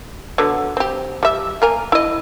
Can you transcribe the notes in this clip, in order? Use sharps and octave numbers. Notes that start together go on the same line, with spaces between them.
D3 F#3 B3
C4 G4
G3 E5
A#3 A#4 G#5
E4 D#5